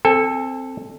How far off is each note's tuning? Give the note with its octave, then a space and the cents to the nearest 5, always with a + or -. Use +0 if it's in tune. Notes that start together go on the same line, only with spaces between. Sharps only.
C4 +0 A4 +0 G#5 -40